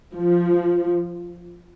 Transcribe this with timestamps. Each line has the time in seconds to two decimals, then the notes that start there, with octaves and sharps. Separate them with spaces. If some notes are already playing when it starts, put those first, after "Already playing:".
0.14 F3